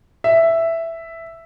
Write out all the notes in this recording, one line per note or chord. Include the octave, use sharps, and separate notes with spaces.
E5